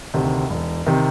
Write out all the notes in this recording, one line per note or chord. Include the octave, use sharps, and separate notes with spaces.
D2 C3 D#3
E1
C3 D#3